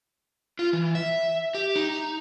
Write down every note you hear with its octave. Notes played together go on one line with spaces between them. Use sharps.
F4
E3
E5
G4
D#4